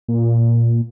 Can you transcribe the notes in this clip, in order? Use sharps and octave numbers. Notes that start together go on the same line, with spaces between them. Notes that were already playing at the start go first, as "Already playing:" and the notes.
A#2